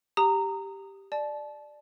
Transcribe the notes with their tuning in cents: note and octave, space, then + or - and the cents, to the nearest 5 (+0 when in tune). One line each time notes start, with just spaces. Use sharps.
G4 +0 A#5 -15 D#6 +0
D5 +15 A5 -30